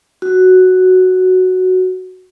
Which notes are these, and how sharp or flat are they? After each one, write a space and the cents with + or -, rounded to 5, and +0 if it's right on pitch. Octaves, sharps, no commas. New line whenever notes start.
F#4 +0